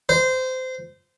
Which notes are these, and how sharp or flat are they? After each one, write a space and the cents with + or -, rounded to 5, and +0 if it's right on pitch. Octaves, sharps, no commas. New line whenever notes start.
C5 -20